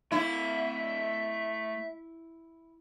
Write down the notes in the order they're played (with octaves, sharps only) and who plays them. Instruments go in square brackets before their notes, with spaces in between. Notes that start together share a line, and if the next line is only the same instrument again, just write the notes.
[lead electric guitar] A3 F5 [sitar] E4 [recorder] E5